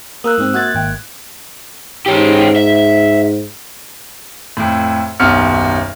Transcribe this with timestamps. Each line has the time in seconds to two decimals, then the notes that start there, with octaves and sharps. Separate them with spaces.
0.24 A#3 A#4 D#6 E6 F#6
0.38 G#2 C4
0.54 A#3 F#4 F#6 G#6 A6
0.75 G#1 G5
2.06 G#2 C#4 G4
2.56 E5
4.57 F2 A2
5.20 D#1 B1 F#2 B3 F6 C#7